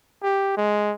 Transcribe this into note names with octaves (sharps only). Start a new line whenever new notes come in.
G4
G#3